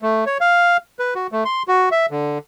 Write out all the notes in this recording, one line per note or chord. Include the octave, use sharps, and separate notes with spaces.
A3
C#5
F5
B4
F#4
A3
C6
F#4
E5
D3